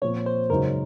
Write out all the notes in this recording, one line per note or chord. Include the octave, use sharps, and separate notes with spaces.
A#2 F3 C4 C#5
C5
F#2 C#3 G#3 D#4 F#4 A#4